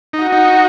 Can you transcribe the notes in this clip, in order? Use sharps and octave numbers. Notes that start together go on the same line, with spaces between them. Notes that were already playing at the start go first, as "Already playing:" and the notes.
D#4
F#4
D#4